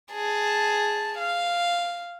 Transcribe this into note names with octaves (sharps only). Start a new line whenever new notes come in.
G#4 A5
F5